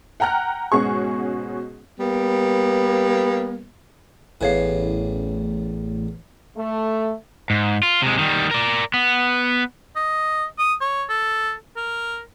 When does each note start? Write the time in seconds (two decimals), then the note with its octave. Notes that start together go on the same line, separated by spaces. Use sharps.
0.20 F#5 G5 A#5 F6 F#6
0.72 G#2 B2 C#4 F#4 G#4 C#6
1.99 G3 A#3 B3
4.41 A1 E2 A2 B4 C#5 F5
6.57 A3
7.50 G#2
7.83 F4
8.02 C3 G#3
8.19 D#3 G3
8.51 A#4 D5
8.94 B3
9.96 D#5
10.58 D#6
10.81 C#5
11.09 A4
11.77 A#4